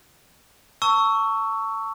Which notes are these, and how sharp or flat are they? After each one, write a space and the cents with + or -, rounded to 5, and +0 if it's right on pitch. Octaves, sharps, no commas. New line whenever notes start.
A5 +30 C#6 +10 E6 +0